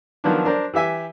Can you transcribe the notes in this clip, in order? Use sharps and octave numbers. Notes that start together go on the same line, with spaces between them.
D#3 F3 F#3 B3 D4
D4 A#4 C5 D5
E3 G4 E5 G#5